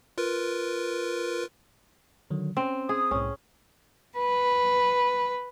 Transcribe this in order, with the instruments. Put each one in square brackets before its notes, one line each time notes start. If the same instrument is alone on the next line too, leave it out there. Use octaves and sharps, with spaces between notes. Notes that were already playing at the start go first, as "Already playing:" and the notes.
[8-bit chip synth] F4 A#4 B4
[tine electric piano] D3 D#3 F#3
[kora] C4 [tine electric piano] C#4
[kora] G#4 [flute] D#6
[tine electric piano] C2 A2 [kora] C#4
[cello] B4